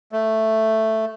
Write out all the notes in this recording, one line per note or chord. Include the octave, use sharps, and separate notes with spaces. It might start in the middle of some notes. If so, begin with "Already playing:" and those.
A3